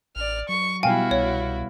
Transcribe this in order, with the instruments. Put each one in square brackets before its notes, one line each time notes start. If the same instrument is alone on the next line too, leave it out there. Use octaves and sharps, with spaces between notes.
[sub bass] A1 [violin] D5 F6
[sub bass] F#3 [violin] C#6
[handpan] B2 G3 F5 [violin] E4 F#4 [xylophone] G5 G#5
[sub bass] C2 [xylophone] C#5